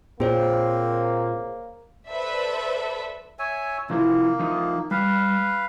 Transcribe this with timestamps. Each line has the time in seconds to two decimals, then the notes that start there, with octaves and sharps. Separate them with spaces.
0.20 A#2 A#3 C4 G#4 C5 C#5
2.09 A4 B4 C5 D5 E5
3.39 C#5 E5 G#5
3.90 C3 F3 A#3 E4
4.40 F3 D#4
4.91 G3 B4 F5